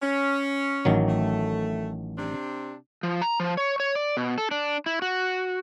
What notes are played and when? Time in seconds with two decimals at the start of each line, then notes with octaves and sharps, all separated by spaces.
0.03 C#4
0.85 A1 D#3 F#3
1.07 A3
2.18 C3 C4 D4
3.03 F3
3.22 A#5
3.40 F3
3.57 C#5
3.80 C#5
3.95 D5
4.17 B2
4.38 A4
4.51 D4
4.86 E4
5.02 F#4